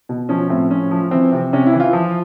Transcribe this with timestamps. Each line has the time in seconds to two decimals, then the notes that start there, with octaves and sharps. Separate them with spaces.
0.09 B2
0.29 F3 C#4
0.49 A2 C4
0.70 F3 C#4
0.91 F3
1.11 E3 C4
1.32 C3
1.53 C3 C#4
1.66 E4
1.73 E3
1.80 F4
1.93 F3